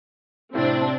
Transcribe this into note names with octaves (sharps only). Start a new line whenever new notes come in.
A2 C3 C4 D4